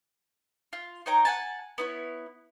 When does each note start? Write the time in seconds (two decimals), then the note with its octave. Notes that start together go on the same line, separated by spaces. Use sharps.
0.73 F4
1.06 D#4 C#5 G5 A#5
1.25 F#5 G#5 A5
1.78 B3 E4 C#5